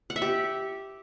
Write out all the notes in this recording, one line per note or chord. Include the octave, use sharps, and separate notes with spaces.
F#5
E5
G4